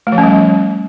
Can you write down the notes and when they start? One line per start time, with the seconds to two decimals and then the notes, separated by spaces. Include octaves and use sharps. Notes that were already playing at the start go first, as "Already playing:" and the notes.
0.07 A3
0.12 F3
0.18 C#4
0.23 G3